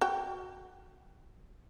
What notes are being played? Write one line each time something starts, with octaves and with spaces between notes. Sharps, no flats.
F#4 G5